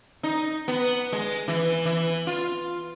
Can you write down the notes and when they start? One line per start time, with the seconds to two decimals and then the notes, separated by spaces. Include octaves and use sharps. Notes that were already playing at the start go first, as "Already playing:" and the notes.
0.23 D#4
0.68 B3
1.12 G#3
1.48 E3
1.85 E3
2.27 F4